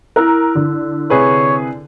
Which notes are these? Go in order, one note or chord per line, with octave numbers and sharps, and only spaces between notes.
E4 A#4 E6 F#6
D3
C3 G#4 B4 C#5